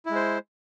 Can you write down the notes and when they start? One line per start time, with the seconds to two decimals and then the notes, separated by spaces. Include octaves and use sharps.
0.06 E4
0.11 G#3
0.15 C5